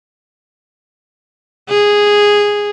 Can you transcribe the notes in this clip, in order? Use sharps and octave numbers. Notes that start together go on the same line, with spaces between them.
G#4